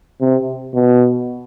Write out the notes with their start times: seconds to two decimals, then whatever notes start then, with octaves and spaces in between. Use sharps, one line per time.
0.21 C3
0.74 B2